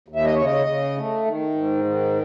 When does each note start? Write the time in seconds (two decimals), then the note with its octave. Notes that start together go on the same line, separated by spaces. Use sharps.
0.08 D#2
0.16 E5
0.25 D#5
0.35 C#3 C#5
0.45 D#5
0.67 C#3
0.96 A3
1.26 D#3
1.55 G#2
1.84 D#3